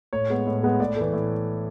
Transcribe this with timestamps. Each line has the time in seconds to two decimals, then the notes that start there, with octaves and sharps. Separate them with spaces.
0.13 A2 C#5
0.30 G#3 B3
0.47 A2
0.63 G#3 B3
0.80 A2 D5
0.96 E3 A3
1.13 A2